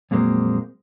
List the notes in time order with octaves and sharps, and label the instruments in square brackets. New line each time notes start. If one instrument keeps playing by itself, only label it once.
[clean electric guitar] F2 A#2 F#3 G#3 A#3 C4